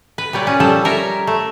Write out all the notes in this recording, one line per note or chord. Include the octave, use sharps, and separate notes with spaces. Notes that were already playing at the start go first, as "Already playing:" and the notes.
B4
A#2 G3 C#5 D5
C#4
F3 G3 A4
A#4 C#5 E5
A3